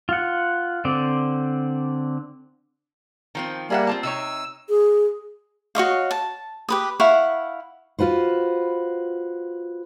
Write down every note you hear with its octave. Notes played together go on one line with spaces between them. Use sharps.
F4 F#5
D3 C4 D5
D#3 F3 C4
G3 A#3 G#4 E5 F#5
C4 F4 A5
C3 D#4 C#5 E6
G#4
F#4 C#5 D#5 F5
A5
G4 B4 D#6
E4 F5 F#5 C#6
F4 F#4 B4 C5